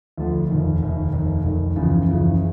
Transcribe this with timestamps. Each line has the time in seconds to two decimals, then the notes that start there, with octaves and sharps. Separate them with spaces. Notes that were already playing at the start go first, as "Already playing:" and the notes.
0.18 D2 D3 F3
0.49 F1 D#2 D#3
0.80 F1 D#2 D#3
1.13 F1 D#2 D#3
1.44 F1 D#2 D#3
1.76 F#1 E2 C#3 F3
2.08 F#1 E2 C#3 F3